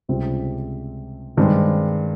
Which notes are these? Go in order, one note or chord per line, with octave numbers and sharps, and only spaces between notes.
C#2 C3 G3 C4
G2 D#3 G#3 C4